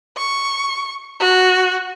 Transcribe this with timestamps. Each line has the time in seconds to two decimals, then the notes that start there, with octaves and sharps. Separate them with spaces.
0.17 C#6
1.20 F#4